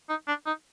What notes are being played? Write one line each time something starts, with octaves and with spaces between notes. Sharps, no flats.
D#4
D4
D#4